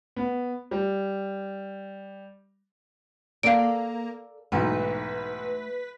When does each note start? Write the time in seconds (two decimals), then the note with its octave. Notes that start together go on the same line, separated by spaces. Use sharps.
0.16 B3
0.71 G3
3.43 A#3 A4 A#4 D5 F5 D7
4.52 B1 G#2 E3 A3 B4